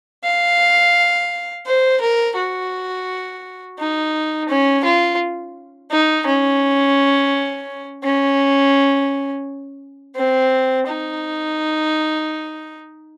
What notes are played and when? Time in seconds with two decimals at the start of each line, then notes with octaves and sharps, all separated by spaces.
0.24 F5
1.66 C5
2.01 A#4
2.37 F#4
3.79 D#4
4.49 C#4
4.85 F4
5.91 D#4
6.26 C#4
8.04 C#4
10.16 C4
10.87 D#4